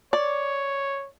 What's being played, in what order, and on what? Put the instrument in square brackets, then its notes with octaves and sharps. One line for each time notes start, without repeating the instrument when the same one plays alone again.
[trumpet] C#5 [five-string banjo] D5